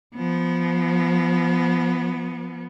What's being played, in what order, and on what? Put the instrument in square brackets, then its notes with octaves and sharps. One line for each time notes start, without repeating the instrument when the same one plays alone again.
[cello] F3 B3